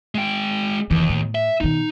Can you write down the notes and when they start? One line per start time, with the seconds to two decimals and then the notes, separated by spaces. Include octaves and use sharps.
0.15 G#3 G5
0.91 F1 D#2 E3
1.09 A2
1.35 E5
1.61 B2 D#3 D#4